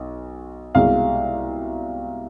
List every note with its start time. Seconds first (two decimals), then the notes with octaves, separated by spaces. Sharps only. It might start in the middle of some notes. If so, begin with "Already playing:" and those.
Already playing: B1
0.75 C2 B2 G#3 F5